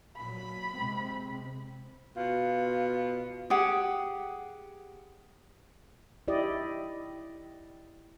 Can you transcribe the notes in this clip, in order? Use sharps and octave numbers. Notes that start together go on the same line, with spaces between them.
A#2 F#3 B5
C3 G#3 C4
B2 F4
G4 G#4 F#5
E4 G4 D5 D#5